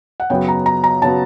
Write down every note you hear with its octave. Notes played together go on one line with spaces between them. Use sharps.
F#5
F#2 C#3 F#3 B3 G5
A#5
A#5
A#5
C#3 F#3 B3 A5